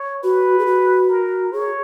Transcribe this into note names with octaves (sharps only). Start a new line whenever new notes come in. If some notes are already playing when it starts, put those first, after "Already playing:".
Already playing: C#5
F#4 B4
G#4
F#4
A#4
G#4 C#5